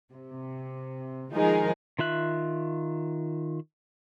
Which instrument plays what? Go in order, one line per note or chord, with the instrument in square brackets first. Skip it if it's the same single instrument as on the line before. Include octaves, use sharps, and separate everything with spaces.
[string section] C3
D#3 F3 G#3 D#4 G#4 A#4
[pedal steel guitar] D#3 F4 E5 F#6